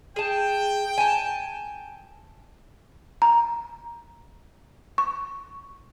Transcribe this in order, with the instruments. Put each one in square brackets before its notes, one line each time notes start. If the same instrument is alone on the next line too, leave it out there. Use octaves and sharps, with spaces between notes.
[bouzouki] G#4 A5 [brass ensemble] G5
[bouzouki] G#5 A5
[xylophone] A#5
C#6